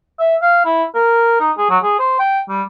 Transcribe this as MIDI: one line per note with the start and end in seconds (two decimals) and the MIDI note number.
0.19 0.36 76
0.42 0.63 77
0.66 0.84 64
0.95 1.38 70
1.40 1.51 63
1.58 1.66 68
1.70 1.78 54
1.83 1.99 68
1.99 2.18 72
2.19 2.40 79
2.49 2.63 55